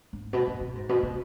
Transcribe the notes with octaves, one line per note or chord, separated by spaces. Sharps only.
G#2
B2
C3
B2
G#2
B2
C3